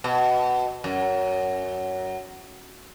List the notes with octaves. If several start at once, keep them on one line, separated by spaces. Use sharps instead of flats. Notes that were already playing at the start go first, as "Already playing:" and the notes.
B2
F#2